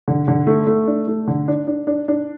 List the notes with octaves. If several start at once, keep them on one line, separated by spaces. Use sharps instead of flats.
D3
D3
A3
A3
D4
A3
D3
D4
D4
D4
D4